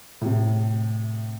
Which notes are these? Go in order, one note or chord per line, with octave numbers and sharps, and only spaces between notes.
A2 C3